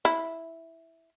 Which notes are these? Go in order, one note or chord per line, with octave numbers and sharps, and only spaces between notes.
E4